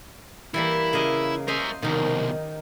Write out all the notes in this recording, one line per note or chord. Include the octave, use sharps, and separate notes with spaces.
E3 G3 A#3 E4
C#3 A#3 D#5
A#4 C5 D#5 E5
C2 B2 D#3 D#4